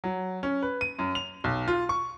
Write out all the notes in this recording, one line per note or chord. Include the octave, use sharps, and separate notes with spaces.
F#3
C#4
B4
D#7
F#2
F7
B1
F4
C#6